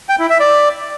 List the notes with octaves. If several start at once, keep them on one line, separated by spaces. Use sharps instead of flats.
G5
E4
E5
D5